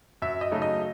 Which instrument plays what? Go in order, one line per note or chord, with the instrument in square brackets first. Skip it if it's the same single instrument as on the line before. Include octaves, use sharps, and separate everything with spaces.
[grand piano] F#2 E5
D#5
C#3 F#3 A3 D#4
D#5